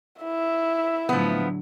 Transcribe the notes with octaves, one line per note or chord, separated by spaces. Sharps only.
E4 E5
A2 D3 F3 F#3 B3